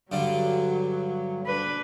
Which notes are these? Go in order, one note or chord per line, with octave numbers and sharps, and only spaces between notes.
G2 D3 F#3
D4 B4